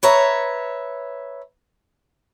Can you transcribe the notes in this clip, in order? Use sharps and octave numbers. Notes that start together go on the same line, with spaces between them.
B4 C#5 E5 A#5